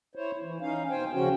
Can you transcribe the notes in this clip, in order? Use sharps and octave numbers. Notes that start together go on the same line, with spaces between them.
E4 C5 C#5
E3
C#4 D#4 F5
B2 C5 G5 G#5
D#2 C#3 F3 C#4 F#4 G5